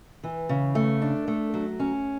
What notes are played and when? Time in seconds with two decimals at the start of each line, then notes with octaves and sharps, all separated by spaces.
0.24 E3
0.49 C#3
0.75 A3
1.02 D4
1.28 A3
1.54 F#3
1.80 C#4